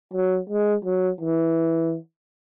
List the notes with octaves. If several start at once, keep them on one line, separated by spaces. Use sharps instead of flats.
F#3
G#3
F#3
E3